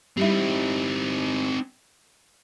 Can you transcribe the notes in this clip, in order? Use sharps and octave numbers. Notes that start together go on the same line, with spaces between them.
G3 C4 D#4 E4